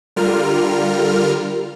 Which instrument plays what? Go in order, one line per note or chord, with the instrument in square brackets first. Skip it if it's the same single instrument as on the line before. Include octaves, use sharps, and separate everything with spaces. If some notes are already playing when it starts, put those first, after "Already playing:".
[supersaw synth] D3 G3 F4 A#4 F6